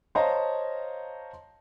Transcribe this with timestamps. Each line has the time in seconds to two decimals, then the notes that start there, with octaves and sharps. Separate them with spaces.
0.15 C5 C#5 D#5 F5 A5 A#5